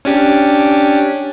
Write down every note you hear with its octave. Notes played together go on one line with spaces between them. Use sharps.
C#4 D4 G4